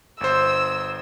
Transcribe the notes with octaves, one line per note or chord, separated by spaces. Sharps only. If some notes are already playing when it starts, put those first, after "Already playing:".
G1 C5 E6